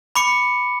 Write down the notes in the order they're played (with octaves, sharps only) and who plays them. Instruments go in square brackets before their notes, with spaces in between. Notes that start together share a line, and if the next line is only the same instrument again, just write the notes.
[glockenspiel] B5 D6 C#7